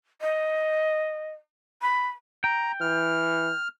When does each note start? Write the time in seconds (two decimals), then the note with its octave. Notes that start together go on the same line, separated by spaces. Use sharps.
0.21 D#5
1.82 B5
2.44 G5 A#5
2.81 E3 F6